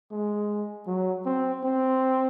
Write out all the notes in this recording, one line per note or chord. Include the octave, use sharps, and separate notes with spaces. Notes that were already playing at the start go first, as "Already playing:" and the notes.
G#3
F#3
C4
C4